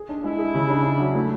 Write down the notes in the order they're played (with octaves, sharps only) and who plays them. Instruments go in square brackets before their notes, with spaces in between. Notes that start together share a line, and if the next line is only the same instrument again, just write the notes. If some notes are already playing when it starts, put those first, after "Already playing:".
Already playing: [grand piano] G#4
D4
[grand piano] G#3 [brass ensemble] E4
[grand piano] G#4
C#3
D4
D4
F#3
A3